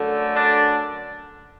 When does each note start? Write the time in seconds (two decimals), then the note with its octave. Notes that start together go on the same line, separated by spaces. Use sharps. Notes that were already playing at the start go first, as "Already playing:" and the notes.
Already playing: F#2 D3 A3
0.35 D4